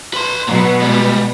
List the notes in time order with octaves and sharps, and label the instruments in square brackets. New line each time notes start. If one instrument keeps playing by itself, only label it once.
[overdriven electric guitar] B4 C6
[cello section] B2 B3 [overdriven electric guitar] F#3
[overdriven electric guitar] G3 G#3